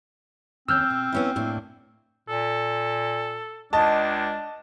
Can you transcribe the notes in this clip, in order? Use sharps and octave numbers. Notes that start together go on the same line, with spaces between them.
D#2 C4 C#4 E6 F6 G6
B2
B3 C#4 E4
A2 A#3 D4
A#2 A4
C#2 D4 D#5 A5